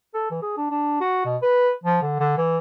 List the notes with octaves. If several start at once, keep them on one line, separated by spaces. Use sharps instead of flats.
A4
E3
G#4
D4
D4
F#4
B2
B4
F3
D3
D3
E3